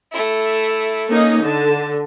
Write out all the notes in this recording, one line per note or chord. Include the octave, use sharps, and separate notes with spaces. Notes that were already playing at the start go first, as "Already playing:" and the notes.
A3 E4
A#3 C#4 D#4
D3 A5